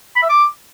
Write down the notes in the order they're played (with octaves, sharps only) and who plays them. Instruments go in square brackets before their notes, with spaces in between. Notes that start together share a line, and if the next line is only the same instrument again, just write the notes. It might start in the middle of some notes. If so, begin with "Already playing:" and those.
[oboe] B5
E5
D6